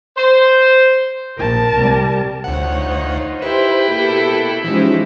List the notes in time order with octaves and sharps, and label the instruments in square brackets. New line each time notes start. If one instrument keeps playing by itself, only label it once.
[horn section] C5
[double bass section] A#1 [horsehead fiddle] A#4 A5
[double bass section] C2 G3
[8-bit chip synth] D2 F#5 [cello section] D#4 F4 [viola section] C5 C#5
[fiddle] E4 G5 [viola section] G4 C5 [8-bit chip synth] B4
[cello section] B2 A4 [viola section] A#3 G4
[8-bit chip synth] E3 [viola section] F3 G#3 G4 [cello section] C#4 D#4 [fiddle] E4